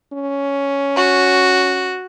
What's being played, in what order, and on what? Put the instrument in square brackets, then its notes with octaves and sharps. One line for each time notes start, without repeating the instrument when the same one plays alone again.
[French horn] C#4
[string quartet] F#4